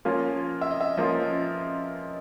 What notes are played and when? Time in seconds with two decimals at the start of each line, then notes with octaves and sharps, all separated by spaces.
0.05 F3 A#3 C#4 F4
0.61 E5
0.71 D#5
0.81 E5
0.97 F3 A#3 C#4 F4 D#5